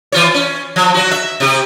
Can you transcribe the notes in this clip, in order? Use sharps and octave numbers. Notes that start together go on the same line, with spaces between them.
E3 F4 C#5
C#4
F3
F#3 F#4
E5
C3 G4